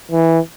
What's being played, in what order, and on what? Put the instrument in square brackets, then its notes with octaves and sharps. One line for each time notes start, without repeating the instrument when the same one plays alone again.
[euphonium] E3